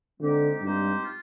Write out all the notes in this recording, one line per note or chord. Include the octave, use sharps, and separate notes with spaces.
D3 G#3 C4 D#4 G4 C5
G2 G#3 C4 D#4 G4 C5
F4